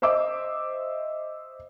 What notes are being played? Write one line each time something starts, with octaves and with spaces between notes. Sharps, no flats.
C5 D#5 E5 D6